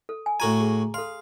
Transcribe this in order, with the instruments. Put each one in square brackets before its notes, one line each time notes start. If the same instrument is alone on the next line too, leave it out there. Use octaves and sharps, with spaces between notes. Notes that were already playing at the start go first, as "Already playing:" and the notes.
[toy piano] A4
G#5
[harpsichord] A2 F#4 G#5 [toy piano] A#5
[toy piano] G#4
[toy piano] A4 C6 [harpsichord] F5